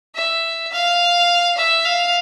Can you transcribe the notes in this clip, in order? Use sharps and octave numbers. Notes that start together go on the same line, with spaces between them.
E5
F5
E5
F5